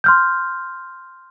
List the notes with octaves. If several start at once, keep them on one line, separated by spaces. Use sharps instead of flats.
C6 F6 G6